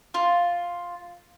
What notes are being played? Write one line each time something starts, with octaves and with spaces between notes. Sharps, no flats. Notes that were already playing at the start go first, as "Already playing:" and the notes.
F4